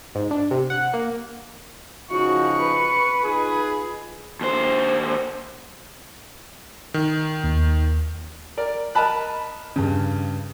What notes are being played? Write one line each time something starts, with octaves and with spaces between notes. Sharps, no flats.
G#2
D4
C3
F#5
A#3
C#3 F3 D#4 F#4 C#6
B4
D#4 F4 G#4
D#2 C5
D#3
D#2
A#4 D5
A#4 D#5 A5 B5 F#6
G2 C#3